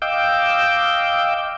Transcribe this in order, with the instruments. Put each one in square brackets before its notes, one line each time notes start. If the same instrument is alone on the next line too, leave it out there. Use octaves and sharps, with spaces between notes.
[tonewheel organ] D#5 F5 G5 D6 E6 G6